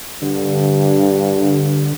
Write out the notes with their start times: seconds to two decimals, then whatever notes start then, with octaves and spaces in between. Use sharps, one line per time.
0.22 G2 D3